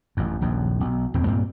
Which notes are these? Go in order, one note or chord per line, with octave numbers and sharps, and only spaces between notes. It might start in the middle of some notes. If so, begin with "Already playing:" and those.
A1 F#2
D#1 A#1 F#2
B1
D#1 E2 A2 C4
G2 A#2 A#3 C4